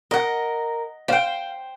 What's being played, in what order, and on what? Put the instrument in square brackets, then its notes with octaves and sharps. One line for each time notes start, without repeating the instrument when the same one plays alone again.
[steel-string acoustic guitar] A#4 [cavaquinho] D#5 F#5
[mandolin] C5 G5 [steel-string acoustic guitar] F5